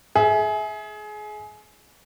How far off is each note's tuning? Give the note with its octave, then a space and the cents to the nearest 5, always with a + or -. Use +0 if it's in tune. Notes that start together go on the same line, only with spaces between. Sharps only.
G#4 +25 E5 -20